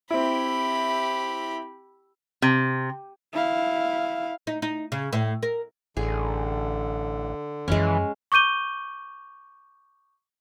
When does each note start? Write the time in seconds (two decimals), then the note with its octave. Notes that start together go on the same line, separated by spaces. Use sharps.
0.11 C4 E4 G4 B5
2.42 C3
3.33 E4 F5
4.47 D#4
4.62 D#4
4.92 C#3
5.13 A2
5.43 A#4
5.97 A1 D3 G#4
7.68 F#2 E3 F3 G#3 C#4
8.32 C#6 D6 G6 D#7 G7